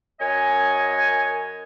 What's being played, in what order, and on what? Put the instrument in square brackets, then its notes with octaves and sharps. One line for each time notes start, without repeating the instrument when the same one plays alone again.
[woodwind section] F#2 C#5 D#5 G#5